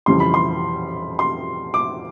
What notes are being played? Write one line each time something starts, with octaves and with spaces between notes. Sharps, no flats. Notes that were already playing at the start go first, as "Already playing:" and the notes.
F2 C#3 E3 G3 C6
B5
C6
C6
D6